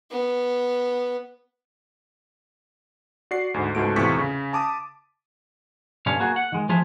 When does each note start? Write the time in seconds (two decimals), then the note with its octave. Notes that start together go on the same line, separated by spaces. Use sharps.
0.11 B3
3.31 F#4 D5 C7
3.54 D2 G#2
3.75 C#2 G#2 A3 F#4 D7
3.96 E2 A2 C3 F4 C#6 B6
4.18 C#3
4.53 A5 D6 D#6
6.06 B1 G2 D3 G3 C#4 F5
6.20 A#3 F#4 G#4
6.36 F#5
6.52 D#3 G#3
6.69 F3 A3 F4 G#4 E5